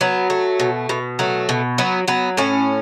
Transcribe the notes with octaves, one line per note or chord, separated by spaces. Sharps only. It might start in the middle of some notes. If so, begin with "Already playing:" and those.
F#3 B3
A3
B2
B2
F#3 A3
B2
F#3 B3
F#3 B3
A2 C#4